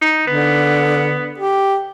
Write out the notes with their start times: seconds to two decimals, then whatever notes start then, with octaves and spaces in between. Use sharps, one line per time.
0.02 D#4
0.27 D3 B3
1.38 G4